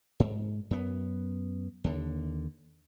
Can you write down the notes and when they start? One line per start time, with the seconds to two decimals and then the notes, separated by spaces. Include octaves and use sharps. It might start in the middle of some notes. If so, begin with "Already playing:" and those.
0.20 G#2
0.71 F#2 B3
1.84 D#2 D3